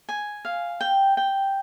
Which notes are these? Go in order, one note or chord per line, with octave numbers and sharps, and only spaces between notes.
G#5
F5
G5
G5